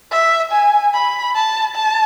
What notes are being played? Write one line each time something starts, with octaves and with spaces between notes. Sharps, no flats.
E5
G#5
B5
A5
A5